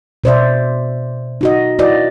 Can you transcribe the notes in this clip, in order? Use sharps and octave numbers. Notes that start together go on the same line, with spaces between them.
B2 C5 D5 E5
D#4 F#4 D#5
E4 F#4 B4 D5 D#5